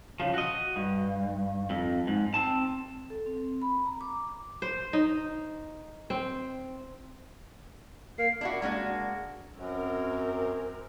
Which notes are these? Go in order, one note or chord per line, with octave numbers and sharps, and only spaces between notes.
C#3 F3
F#4 D#5
G2
F2
G#2
C4 A5
A4
C4
B5
A#5
D6
C5
D#4
C4
A#3 C7
D4 E4 F#4
G#3 A#3 D4 F#4
F#2 C4 A#4